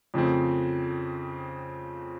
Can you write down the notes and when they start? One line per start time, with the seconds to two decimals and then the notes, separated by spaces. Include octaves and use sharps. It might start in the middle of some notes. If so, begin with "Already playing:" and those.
0.14 F2 C#3 F3 A3 C4